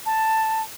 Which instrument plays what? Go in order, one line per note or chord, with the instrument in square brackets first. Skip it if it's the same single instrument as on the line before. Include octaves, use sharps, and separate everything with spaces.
[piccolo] A5